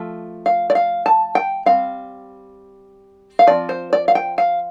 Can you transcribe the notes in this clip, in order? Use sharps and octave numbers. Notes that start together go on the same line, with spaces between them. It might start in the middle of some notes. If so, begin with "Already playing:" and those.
Already playing: F3 A3
F5
D5
F5
A5
G5
G3 C4 F5
F5
F3 C4 D5
C5
D5
F5
G5
F5